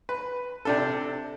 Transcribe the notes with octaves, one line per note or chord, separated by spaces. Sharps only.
B4
C3 D4 A4